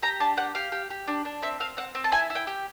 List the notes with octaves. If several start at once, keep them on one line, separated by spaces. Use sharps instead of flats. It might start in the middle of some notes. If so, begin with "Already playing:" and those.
G4 A#5
D4 A5
G4 F#5
G4 F5
G4
G4
D4
D4
C4 E5
C4 F5
C4 F#5
C4
A5
E4 G#5
E4
G5
G4